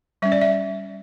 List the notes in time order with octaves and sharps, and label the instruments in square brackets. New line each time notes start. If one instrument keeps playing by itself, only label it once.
[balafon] G3 C#4 E5
D5
E5